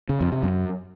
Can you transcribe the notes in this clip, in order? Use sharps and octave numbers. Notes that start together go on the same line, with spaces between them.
C#3
F2
C3
F#2